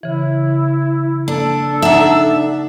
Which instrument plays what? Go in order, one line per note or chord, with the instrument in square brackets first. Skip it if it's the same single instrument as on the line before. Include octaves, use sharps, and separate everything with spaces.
[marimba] C#3 E3 [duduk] E4
[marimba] A#3 [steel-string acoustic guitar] D4 [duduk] A4
[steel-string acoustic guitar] D4 E5 [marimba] D#4 F#5 A#5